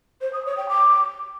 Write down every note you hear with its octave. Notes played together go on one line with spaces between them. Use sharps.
C5
D#6
C#5
G5
D6